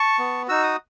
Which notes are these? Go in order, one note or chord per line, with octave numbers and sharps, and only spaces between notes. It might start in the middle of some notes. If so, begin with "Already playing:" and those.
Already playing: A5 C#6
B3
D#4 F#4 E6
D#6